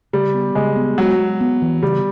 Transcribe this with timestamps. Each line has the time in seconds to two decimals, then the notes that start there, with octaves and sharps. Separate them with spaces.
0.13 C#3 G3
0.34 B3
0.55 C#3 G#3
0.76 B3
0.98 F#3 G#3
1.19 G#3
1.41 B3
1.62 E3
1.82 C#3 G3